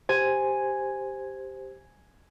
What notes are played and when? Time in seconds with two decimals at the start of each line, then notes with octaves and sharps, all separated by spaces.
0.09 G4 C5 G#5